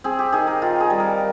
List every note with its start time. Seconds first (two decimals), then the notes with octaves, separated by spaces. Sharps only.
0.04 C4 G#4
0.19 G4
0.32 D#3 G#4
0.47 A#4
0.62 D#3 F4
0.80 G#4
0.90 G3
1.00 A#4